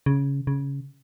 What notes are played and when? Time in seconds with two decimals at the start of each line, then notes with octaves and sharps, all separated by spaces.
0.06 C#3
0.47 C#3